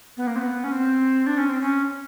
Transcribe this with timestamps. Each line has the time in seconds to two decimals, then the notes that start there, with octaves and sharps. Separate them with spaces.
0.17 B3
0.27 A#3
0.36 C4
0.39 B3
0.64 C#4
0.72 C4
1.27 D4
1.38 C#4
1.49 C4
1.61 C#4